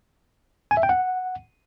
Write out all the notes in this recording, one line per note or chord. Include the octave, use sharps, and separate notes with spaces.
G#5
E5
G5
F#5